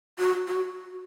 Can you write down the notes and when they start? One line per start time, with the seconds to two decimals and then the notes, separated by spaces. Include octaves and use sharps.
0.19 F#4
0.48 F#4